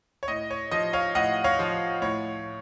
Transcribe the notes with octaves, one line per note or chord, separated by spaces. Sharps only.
C#5
A2 D#5
C#5
F3 D#5
C#5 F5
A2 D#5 F#5
C#5 F5
F3
A2 C#5